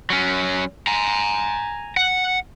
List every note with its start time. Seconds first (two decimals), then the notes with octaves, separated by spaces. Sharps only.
0.10 F#3 C#4
0.87 G#5 A#5
1.97 F#5